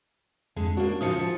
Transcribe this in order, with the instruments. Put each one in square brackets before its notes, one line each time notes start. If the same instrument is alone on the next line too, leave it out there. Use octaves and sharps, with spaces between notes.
[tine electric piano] F2 [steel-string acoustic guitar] D3 G#3
[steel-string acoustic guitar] A#3 D4 [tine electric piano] C#4 F#4
[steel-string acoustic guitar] C#3 F3 D#4 [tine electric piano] D#6 C#7
[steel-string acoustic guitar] F3